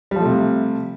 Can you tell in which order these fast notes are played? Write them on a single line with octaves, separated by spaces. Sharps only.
G3 F3 A3 C3